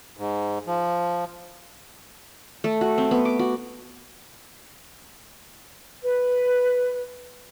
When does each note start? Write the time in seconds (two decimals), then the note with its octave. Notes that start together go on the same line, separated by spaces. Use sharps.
0.17 G#2
0.67 F3
2.64 A3
2.81 F#4
2.98 C4
3.11 B3
3.25 D6
3.39 F#4
6.04 B4